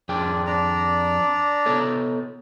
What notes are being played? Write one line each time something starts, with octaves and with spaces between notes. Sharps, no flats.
F2 D4 G#4 D5 G5
D4 D5 A#5
B3 A4 C#5